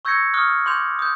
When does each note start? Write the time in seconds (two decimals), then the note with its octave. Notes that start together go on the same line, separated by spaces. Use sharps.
0.05 C#6 E6 G6 G#6 A#6 C#7
0.34 C#6 D#6 F6 F#6
0.66 C6 D6 G6 F7
0.99 D#6 G6